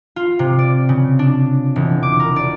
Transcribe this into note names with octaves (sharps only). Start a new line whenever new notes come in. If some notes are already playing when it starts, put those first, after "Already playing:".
F4
C3
D5
C#3
D4
E1
D6
A#4
D5